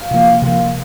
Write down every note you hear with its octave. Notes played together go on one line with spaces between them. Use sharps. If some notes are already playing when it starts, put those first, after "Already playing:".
Already playing: F5
C3 F3 A#3
C3 F3 A#3